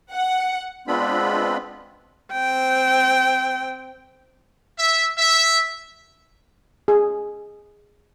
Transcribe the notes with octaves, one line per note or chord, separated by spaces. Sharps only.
F#5
G#3 B3 C4 D4 F4 B5
C4 G5
E5
E5
G#4